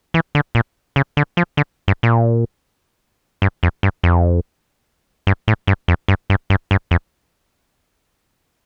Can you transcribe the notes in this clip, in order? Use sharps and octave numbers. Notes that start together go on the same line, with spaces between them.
E3
D3
A#2
C#3
D3
F3
D3
G2
A#2
G2
F2
G2
F2
G2
A2
G2
F2
G2
G2
G2
G2
F2